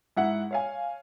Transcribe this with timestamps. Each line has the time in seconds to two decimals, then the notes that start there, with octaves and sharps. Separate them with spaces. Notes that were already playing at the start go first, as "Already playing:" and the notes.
0.17 G#2 E4 F#5
0.51 C#5 F5 G#5